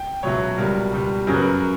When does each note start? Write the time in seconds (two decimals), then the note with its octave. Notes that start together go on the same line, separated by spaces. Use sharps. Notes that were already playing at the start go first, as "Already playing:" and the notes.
Already playing: G5
0.23 C#2 B2 F#3 C#5 E5
0.58 C#2 B2 G3 A#4
0.92 C#2 B2 G3
1.27 F#2 C#3 F#3 A#4
1.35 B4
1.42 A#4